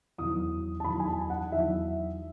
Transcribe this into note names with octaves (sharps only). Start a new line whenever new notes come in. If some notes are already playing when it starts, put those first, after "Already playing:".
E2 D#3 F#3 D#6
A5
E2 D#3 F#3 B5
G#5
A5
F#5
E2 D#3 F#3 E5